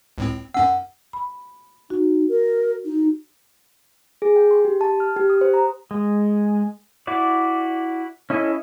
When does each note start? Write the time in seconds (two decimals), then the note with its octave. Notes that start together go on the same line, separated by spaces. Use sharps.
0.18 C#2 A2 C4
0.54 F#2 C#4 F#5 E6
1.13 B5
1.90 D#4 F#4
2.29 A#4
2.85 D#4
4.22 G#4
4.36 G5
4.51 C6
4.65 G4
4.81 A5
5.00 F6
5.17 G4
5.30 D#6
5.41 C5
5.54 A#5
5.91 G#3
7.07 E4 F#4 D5
8.30 C#4 E4 A4 D#5